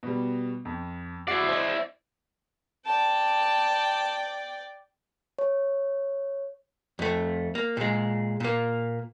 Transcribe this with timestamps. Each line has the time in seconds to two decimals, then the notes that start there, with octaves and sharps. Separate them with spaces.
0.03 B2 G3
0.65 F2
1.28 E4 F#4 D5 C7
1.48 C5 D#5
2.86 D5 G5 A5
5.39 C#5
6.99 F2 A3
7.55 A#3
7.77 A#2 G#3
8.40 A#2 A#3